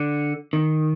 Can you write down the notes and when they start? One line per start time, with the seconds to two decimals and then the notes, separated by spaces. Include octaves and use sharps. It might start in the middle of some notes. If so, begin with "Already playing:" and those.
Already playing: D3
0.53 D#3